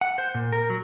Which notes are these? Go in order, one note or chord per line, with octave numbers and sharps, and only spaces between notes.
F#5
C5
A#2
A#4
F#3